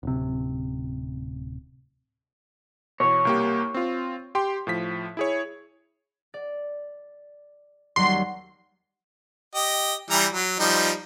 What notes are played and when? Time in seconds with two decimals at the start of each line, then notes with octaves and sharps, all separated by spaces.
0.03 D1 C3
3.00 B2 E3 C#5
3.25 C2 A#3 G4
3.74 C4 F4
4.35 G4 G5 C6
4.67 A2 F3 B6
5.17 E4 G#4 C#5
6.34 D5
7.96 D#2 F#3 G3 C6
9.55 G4 D#5
10.11 E3 G3 A#5
10.33 F#3
10.59 F3 G3 D#4